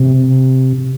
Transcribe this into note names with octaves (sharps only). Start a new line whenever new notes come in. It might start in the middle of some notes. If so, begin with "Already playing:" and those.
Already playing: C3